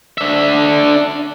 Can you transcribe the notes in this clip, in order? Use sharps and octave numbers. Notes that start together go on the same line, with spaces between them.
D4 E5